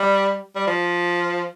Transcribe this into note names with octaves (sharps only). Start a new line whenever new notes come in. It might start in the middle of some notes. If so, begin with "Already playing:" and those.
Already playing: G3
G3
F3